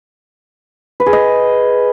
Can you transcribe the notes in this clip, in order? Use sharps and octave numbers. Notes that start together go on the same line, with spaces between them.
B4
G#4
D#5